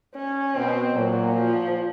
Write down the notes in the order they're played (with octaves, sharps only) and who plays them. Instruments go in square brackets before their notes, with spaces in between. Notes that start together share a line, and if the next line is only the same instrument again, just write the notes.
[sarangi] C#4
[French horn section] B2 [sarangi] C4
[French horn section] A#2 [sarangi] F#3
[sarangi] F3